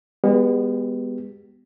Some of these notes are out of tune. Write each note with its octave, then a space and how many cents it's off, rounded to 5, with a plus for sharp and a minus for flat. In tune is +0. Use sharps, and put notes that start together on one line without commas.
G#3 -40 B3 +0 G4 -30